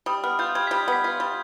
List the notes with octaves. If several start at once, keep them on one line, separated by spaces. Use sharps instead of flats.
G3 D#6
B3 F6
F4 G6
G3 G#6
G3 B6
B3 B6
F4
G3